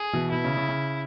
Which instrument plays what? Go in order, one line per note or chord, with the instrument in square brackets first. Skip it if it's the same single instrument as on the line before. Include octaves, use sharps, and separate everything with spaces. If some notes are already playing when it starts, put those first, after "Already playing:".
Already playing: [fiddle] G#4
[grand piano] B2 E3
[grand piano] B2 [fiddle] E4
[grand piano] C#3
C#3
C#3